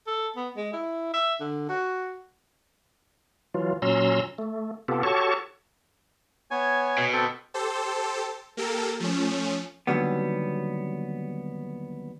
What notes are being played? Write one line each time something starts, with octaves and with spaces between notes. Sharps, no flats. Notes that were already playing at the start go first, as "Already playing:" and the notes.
A4
B3
G#3
E4
E5
D3
F#4
E3 F#3 F4
A#2 F#3 C#4 A#5 C6 E6
A3
C3 B3 F4 G4 A4
F#4 G4 A4 C#5 A5 C#6
B3 C#5 G#5
B2
C4 A4
G4 A4 C5
A#3 G4 A4 A#4
F3 A3 C#4
D#2 B2 D3 F#3 G3 B3